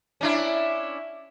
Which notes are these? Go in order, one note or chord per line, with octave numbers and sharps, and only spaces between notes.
C#4 D4 E4